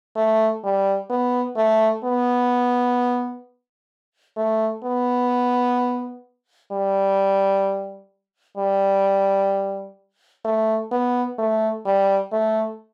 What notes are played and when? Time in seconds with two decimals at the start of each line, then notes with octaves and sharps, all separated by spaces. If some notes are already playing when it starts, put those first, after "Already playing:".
0.16 A3
0.64 G3
1.10 B3
1.57 A3
2.04 B3
4.37 A3
4.84 B3
6.72 G3
8.58 G3
10.45 A3
10.92 B3
11.39 A3
11.86 G3
12.32 A3